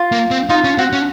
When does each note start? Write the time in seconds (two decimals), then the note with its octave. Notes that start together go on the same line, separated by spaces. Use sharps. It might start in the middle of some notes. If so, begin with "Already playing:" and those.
Already playing: F4
0.12 A#3
0.31 C4
0.50 D#4 F4
0.64 C#4
0.78 C4 F#4
0.93 C#4